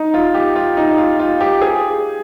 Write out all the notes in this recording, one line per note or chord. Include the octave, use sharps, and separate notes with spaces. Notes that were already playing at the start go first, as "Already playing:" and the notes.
Already playing: D#4
F4
G4
F4
D#4
F4
F4
G4
G#4